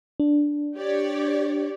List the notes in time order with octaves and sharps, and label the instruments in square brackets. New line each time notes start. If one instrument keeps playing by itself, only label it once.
[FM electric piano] D4
[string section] G4 C#5 D5